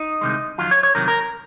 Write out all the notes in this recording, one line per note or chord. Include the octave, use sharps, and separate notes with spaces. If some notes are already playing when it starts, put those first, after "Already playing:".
Already playing: D#4
C2 C3 D#3 G#3
F2 D#3 F#3 F4
C#5
C#5
C2 C3 D#3 F#3 A#4
A#4